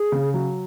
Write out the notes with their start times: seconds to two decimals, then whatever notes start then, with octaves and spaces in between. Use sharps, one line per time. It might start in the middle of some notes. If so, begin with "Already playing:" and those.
Already playing: G#4
0.12 C#3
0.34 F#3